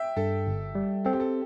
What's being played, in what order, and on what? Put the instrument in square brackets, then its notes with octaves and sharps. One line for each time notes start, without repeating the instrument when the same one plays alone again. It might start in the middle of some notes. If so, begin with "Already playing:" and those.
Already playing: [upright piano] E5 G5
[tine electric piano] G2 [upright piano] A4
[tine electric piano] G1
G3
[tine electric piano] C4 [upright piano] A4
[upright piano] G4
A4